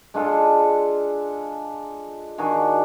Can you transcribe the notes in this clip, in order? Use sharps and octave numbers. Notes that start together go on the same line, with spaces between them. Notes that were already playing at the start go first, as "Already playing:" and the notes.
G#3 D4 F4 A4
D#3 D4 F#4 G#4